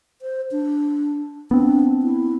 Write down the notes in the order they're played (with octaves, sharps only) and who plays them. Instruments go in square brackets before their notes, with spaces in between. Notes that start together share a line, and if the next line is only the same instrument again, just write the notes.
[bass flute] C5
D4
[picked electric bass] B3 C4 [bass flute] D4
[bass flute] E4